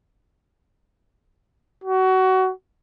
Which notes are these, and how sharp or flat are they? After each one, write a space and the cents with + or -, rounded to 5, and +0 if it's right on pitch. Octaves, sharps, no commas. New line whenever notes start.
F#4 +25